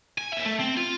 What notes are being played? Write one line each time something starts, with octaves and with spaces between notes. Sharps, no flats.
G#5
D#2 E5
A3
C4
F4